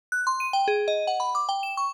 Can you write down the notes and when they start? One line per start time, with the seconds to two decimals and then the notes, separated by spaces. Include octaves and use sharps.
0.12 F#6
0.27 C6
0.40 D#7
0.53 G5
0.68 G#4
0.88 D#5
1.07 F#5
1.20 B5
1.35 D6
1.49 G5
1.63 E7
1.77 C#6